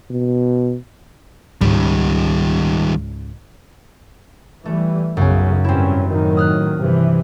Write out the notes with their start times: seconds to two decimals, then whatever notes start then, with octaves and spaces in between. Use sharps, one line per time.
0.10 B2
1.61 C#2 G#2 D#3 G3
4.65 E3 G3 A3
5.17 B1 F#2 C#3 C#4
5.64 G#1 G2 C4 C#4 E4
6.08 A2 D#3 F#3
6.37 D#6 F6 F#6
6.79 G2 C3 E3